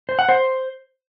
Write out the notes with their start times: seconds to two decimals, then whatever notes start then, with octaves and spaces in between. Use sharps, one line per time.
0.09 C5
0.19 F#5
0.29 C5